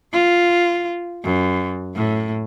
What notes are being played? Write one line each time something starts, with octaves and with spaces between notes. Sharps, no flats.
F4
F#2
A2